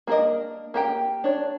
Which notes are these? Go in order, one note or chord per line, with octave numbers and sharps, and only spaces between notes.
A#3 D4 A4 A#4 D#5
A#3 G4 G5
D4 C#5